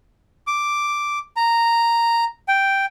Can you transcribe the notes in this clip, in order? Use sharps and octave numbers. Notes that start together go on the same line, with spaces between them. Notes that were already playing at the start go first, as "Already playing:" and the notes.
D6
A#5
G5